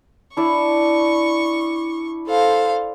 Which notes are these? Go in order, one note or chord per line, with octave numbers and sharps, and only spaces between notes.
D4 E4 D5 C#6
A4 C5 F5